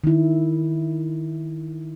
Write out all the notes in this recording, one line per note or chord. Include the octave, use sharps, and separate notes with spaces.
D#3 E4